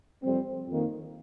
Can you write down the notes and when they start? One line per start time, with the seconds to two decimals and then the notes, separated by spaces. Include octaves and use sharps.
0.23 F2 C3 G3 C4
0.67 F2 D#3 A#3